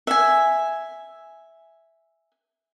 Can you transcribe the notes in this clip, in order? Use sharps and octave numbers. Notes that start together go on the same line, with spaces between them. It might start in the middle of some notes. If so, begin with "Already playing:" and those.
E5 G#5